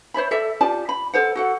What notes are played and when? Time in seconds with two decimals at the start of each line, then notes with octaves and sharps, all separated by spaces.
0.14 C5 C#5 E5 B5
0.31 A4 D5 E5
0.61 F4 G4 D5 A5
0.89 B5
1.13 A4 C5 F#5
1.35 F#4 A4 F#5